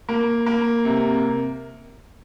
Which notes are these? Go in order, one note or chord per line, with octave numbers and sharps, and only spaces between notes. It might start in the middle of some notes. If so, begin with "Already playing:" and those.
A#3
A#3
C3